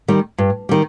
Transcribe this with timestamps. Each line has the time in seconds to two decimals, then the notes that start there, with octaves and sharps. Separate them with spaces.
0.08 D#3 G3
0.38 G2
0.69 D#3 G3